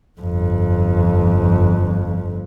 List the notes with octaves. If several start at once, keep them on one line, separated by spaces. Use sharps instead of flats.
G1 F2